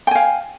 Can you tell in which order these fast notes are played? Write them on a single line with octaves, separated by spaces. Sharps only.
G5 G#5 F5